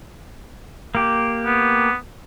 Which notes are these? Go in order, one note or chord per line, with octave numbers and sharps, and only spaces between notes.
A#3 G4
B3